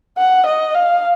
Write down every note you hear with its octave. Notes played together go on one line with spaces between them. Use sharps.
F#5
D#5
F5